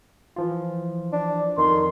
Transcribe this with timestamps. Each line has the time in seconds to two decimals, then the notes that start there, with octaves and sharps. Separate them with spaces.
0.36 E3 F3 F4
1.13 D4
1.58 F2 D#3 C6